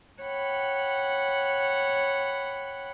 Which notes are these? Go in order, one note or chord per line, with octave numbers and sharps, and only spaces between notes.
C#5 F#5 G5 B5